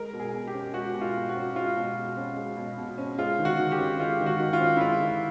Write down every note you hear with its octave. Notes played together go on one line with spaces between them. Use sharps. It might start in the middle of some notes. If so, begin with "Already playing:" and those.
Already playing: G#3 A#4
B2
G#4
B2
G4
C#4
G#3 F#4
B2
F4
B2
F#4
C#4
G#3 F4
B2
B2
C#4
G#3
B2
B2
C#4
G#3 F4
D#3
F#4
D#3
G4
C#4
G#3 F4
D#3
F#4
D#3
F4
C#4
E4
G#3 F4
D#3